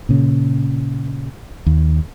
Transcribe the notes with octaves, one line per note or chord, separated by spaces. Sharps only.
A#2 C#3
D#2